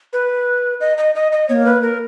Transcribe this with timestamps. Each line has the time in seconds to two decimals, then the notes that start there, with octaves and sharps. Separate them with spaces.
0.13 B4
0.81 D#5
0.98 D#5
1.15 D#5
1.32 D#5
1.49 B3 C#5
1.53 A#3
1.66 B4
1.82 A#4